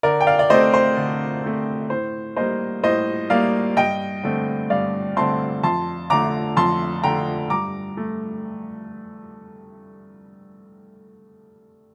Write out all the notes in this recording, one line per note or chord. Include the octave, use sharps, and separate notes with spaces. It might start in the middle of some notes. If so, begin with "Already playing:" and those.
D3 A#4 D5
G5
D5 F5
D5
A3 C4 C5 D#5
C5
D3
A3 C4
A2 C5
G3 A#3 C5 D#5
A2 C5 D#5
G3 A#3 D5 F5
G2 D#5 G5
D3 A3 C4
G2 D5 F5
D3 A3 C4 A5 C6
F2 A5 C6
D3 A3 A#5 D6
F2 A5 C6
D3 A3 G5 A#5
G2 A#5 D6
A3